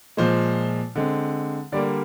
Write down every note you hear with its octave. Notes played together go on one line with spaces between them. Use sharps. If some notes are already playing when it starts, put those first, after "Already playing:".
A#2 F3 G#3 C5
D3 G#3 C4
D3 G3 A#3 D5